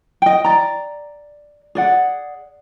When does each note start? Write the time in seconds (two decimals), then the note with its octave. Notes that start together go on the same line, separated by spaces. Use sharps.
0.22 D#5 G5
0.44 D5 A#5
1.75 G#4 D5 F#5